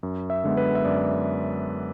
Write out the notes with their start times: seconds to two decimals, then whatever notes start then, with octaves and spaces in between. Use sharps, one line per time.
0.03 F#2
0.30 E5
0.44 D3 G#3 B3
0.57 B4
0.75 E5
0.85 F#2 D5